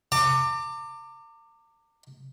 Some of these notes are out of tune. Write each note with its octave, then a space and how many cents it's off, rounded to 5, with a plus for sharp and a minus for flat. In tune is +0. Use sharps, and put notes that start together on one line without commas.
A#5 -45 D6 +15